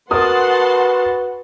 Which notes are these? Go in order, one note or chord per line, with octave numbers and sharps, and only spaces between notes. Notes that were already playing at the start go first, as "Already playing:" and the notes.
F#4 A#4 B4 F#5 A5 C6 D#6